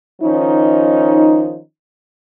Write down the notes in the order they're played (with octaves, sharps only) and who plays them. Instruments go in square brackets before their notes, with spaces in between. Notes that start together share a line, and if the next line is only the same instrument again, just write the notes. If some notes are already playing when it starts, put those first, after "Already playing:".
[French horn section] D#3 F3 C#4 D#4